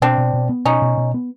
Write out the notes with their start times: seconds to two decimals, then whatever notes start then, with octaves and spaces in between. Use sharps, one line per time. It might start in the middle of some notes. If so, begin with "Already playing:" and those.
0.02 B2 C4 D4
0.18 B2
0.33 B2
0.49 B3
0.65 B2 C#4 D#4
0.82 B2
0.97 B2
1.14 B3